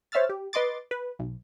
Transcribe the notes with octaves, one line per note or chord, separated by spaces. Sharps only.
C5 C#5 E5 E6 F6 A6
G4
B4 D#5 C6 D6 A6
B4
B1